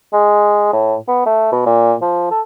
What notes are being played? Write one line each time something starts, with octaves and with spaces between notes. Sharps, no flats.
G#3
A2
B3
A3
B2
A#2
F3
A4